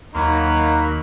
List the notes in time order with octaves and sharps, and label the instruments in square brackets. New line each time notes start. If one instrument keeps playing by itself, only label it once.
[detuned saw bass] D#2 [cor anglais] F#3 [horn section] A#3 B5 [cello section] D#4